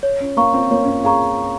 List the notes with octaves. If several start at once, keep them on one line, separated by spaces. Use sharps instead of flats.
C#5
C#4
A#3 F5 A#5 C#6
C4
A#3 C#5
C#4
C4
G#4 F5 A#5 C#6